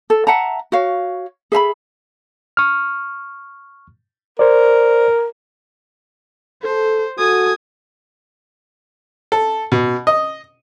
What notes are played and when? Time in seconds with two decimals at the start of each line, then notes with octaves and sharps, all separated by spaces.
0.10 A4
0.27 E5 F#5 A5 A#5
0.72 F#4 C#5 F5
1.52 G#4 E5 A#5 B5
2.57 C#6 F6
4.39 A#4 C5 D5
6.63 A4 C5
7.18 F#4 A4 G#5 D#6
9.32 A4
9.72 B2
10.07 D#5